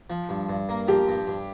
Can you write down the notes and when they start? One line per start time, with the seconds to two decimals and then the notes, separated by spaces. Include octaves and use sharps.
0.10 F3
0.29 G2
0.49 G2
0.69 A#3
0.88 F3 G4
1.08 G2
1.27 G2